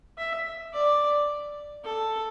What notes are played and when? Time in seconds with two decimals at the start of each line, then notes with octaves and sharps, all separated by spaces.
0.18 E5
0.73 D5
1.84 A4